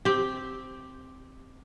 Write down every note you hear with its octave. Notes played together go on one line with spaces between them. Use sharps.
C4 G4